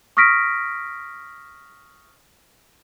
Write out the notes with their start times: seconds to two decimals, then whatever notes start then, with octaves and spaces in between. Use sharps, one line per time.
0.17 C#6 D#6 F6 A#6 B6 D7